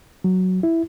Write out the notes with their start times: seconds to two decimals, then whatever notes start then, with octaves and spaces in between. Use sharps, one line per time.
0.24 F#3
0.63 E4